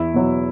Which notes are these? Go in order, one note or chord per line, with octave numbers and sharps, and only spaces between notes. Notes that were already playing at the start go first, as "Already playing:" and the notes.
Already playing: E2 E4
B2 F#3